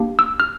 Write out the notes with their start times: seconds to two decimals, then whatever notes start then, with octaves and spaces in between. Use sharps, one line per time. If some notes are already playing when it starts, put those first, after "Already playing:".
Already playing: A#3 D4 G4
0.19 E6
0.40 F6